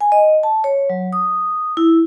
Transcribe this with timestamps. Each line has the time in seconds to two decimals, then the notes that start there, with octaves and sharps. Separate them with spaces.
0.01 G#5
0.12 D#5
0.43 A5
0.64 C#5
0.90 F#3
1.13 D#6
1.77 E4